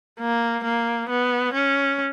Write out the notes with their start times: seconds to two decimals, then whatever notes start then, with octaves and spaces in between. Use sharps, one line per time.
0.19 A#3
0.64 A#3
1.09 B3
1.54 C#4